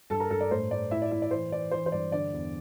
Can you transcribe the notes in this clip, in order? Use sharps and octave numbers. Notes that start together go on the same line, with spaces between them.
G2 A4 A5
A#4 A#5
G2 A4 A5
D5
A2 C5
A2 D5
A2 E4 E5
D5
A2 E4 E5
D5
E3 C5
E3 D5
E3 C5
C5
G2 D5
D3 D5
E2